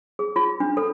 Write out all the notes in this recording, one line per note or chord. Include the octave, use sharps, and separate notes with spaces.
G#4
F4
D4
A4